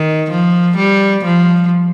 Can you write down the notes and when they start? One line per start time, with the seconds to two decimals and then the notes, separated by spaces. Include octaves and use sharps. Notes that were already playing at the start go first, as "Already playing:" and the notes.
Already playing: D#3
0.31 F3
0.77 G3
1.25 F3